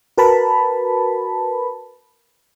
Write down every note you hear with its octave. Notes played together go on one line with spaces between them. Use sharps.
F#4 A#4 B4 A5 B5